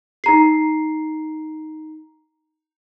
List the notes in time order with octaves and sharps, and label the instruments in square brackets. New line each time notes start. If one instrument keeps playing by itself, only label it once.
[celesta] D#4 A#5 C7